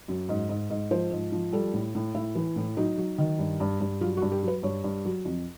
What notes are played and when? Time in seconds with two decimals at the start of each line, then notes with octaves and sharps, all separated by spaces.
0.08 F#2
0.29 G#2
0.49 G#2
0.70 G#2
0.91 F3 C5
1.11 G#2
1.32 F3
1.53 G3 A4
1.73 A2
1.95 A2
2.14 A2 E4
2.35 E3
2.56 A2
2.77 F#3 D#4
2.98 F#3
3.18 D#3
3.39 G2
3.60 G2
3.81 G2
4.01 F#3 F4
4.17 F#4
4.22 G2
4.32 G4
4.43 F#3 B4
4.63 G2 C#5
4.84 G2
5.05 F#3
5.25 F2